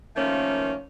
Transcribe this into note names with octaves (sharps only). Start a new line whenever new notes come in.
D#3 F3 A3 A#3 C#4